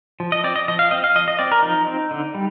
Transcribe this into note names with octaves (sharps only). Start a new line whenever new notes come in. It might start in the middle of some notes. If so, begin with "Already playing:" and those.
F3
D#5
C4 D5
D#5
F3 D#5
F5
C4 D#5
F5
F3 D#5
D#5
C4 D5
A#4
F3 D#4
C4
D3
G3